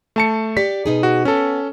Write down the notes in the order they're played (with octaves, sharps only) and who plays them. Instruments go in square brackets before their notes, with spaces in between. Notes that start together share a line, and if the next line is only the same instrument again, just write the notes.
[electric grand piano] A3 A5 C#7
[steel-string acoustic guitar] G4 D5 [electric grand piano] B6
[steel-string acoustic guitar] B2 D#4 G#4
[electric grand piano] F#4
[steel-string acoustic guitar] B3 [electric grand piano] C#4 A4